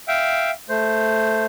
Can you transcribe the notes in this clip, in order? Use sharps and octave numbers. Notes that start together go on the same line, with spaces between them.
E5 F5 G5
A3 C5